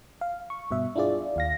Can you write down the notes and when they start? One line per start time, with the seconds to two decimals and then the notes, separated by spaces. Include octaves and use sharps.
0.21 F5
0.50 C#6
0.71 G2 B2 E5
0.96 D4 E4 F4 G#4 D5
1.36 D#2 F5 A#6